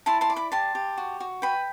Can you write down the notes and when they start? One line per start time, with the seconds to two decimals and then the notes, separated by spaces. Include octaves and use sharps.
0.06 E4 A5 C6
0.21 A5 C6
0.30 D5
0.36 B5 D6
0.52 G4 A5 C6
0.75 G4
0.97 F#4
1.20 F#4
1.42 B4 G5 B5